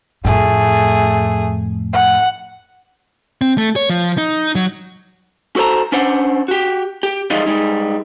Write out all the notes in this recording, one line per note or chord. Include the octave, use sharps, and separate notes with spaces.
F2 A2 A3 G#4
F#5
C4
A3
C#5
F3
D#4
F#3
F#4 A4 C5 A5 A#5
C#4 D4 C5 F#5
F#4 G4
G4
E3 F3 G3 G#3 D#4 F4
G3 G#3 D#4